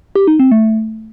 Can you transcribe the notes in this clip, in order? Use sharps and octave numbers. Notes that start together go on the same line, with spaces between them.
G4
D#4
C4
A3